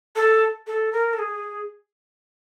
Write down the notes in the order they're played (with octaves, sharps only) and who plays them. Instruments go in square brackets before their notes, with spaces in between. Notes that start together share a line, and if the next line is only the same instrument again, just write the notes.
[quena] A4
A4
A#4
A4
G#4